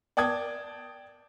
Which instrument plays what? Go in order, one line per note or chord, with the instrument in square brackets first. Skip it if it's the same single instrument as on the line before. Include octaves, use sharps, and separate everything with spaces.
[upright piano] D5 G5 A5 D#6 G#6